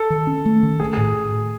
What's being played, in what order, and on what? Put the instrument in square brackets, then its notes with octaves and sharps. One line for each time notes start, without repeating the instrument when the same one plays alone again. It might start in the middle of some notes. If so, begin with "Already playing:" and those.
Already playing: [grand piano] A4
[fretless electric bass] D#3
C#4
A3
D#3
[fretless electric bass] A3 [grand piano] G#4
[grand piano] G#4
[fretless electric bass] A2